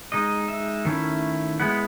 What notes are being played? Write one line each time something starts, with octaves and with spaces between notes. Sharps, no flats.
G#3 D#4 D#5
E5
D#3 A3 C#4 E4
G#3 B3 E4 F#5